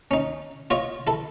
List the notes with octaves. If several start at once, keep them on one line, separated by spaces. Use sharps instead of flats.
C#4 D#4
F4 C#5 D#5
E4 A4